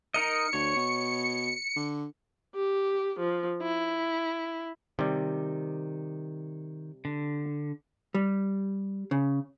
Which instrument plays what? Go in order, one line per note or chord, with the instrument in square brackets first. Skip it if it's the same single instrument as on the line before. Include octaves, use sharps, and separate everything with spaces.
[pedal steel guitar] D#4 A#4 D#5 [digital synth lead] C#7
[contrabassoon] D2 [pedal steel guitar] C#5
[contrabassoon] B2
D3
[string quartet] G4
F3
E4
[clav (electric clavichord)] C3 G3 [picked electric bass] D#3
[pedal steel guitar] D3
[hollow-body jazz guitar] G3
C#3